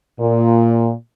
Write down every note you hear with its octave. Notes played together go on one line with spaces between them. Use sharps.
A#2